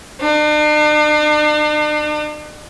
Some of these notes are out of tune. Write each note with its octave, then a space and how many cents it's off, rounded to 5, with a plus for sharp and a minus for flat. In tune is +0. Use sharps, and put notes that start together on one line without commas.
D4 +45